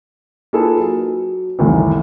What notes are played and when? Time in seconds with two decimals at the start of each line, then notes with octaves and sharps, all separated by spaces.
0.53 A#3 D#4 F4 G#4 A4 B4
0.78 F#3
1.59 F1 C2 A2 D#3 E3